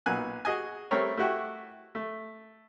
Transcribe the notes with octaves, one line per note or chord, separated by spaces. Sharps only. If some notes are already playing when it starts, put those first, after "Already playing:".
B1 A#2 B3 G#5 F#6
F#4 G#4 D#5 G#5
G3 A3 C4 A#4 C#5
A3 E4 F#4 G4
A3